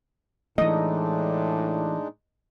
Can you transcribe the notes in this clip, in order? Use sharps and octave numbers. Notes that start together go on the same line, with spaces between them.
A2 E3 G#3 A3 D4 D#4 D#5